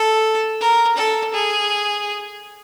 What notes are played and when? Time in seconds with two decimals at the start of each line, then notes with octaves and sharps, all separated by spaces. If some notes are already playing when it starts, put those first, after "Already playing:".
Already playing: A4
0.60 A#4
0.97 A4
1.34 G#4